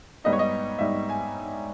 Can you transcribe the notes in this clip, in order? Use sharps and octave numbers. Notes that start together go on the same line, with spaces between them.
G#2 G3 B3 D#4 D#5
C#5
D#5
G#2 G3 B3 D#4 E5
G#5